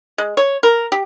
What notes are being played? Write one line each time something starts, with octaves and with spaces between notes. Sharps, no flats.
G#3
C#5
A#4
G4